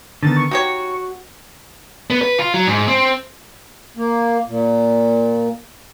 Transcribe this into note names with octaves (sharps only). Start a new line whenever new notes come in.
D3 D#3 B3 A6
C#6
D#4 F#4 G4 C#5
B3
B4
F4
F#3
G#2
C4
A#3
A#2